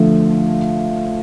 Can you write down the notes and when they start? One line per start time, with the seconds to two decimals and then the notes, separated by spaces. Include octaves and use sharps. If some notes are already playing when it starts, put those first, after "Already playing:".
Already playing: D3 F3 A3